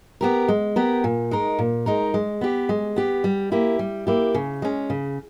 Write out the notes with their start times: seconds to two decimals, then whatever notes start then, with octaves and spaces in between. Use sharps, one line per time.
0.21 B3 G4 A#4
0.48 G#3
0.76 B3 G4 A#4
1.04 A#2
1.31 G#3 D#4 A#4
1.59 A#2
1.86 G#3 D#4 A#4
2.14 G#3
2.41 B3 G4
2.69 G#3
2.96 B3 G4
3.24 G3
3.52 A#3 E4 G4
3.79 G3
4.07 A#3 E4 G4
4.35 C#3
4.62 G#3 C#4
4.90 C#3